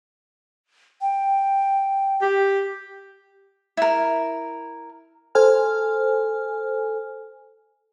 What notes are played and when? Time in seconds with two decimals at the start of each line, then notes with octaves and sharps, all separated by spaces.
1.01 G5
2.21 G4
3.77 E4 A#4
5.35 A4 C5 G#5 F6